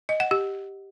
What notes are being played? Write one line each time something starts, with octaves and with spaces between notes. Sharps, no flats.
D#5
F#5
G4